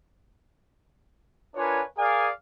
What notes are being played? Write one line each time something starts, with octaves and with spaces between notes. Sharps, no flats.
D4 F4 A#4 B4 C#5 G#5
G#4 A#4 D5 F5 G#5 D#6